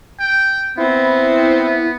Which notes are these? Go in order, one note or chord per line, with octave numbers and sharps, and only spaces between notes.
G5
B3 C4 E4